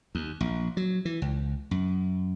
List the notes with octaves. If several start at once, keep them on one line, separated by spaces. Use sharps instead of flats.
D#2
A#1
F#3
E3
C#2
F#2